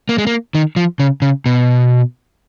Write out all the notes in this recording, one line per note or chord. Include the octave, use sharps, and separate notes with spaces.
A#3
G#3
A#3
D#3
F3
C#3
C#3
B2